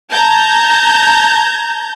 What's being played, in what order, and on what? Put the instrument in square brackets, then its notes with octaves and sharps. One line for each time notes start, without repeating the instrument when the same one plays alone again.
[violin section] A5 A#5 G6 G#6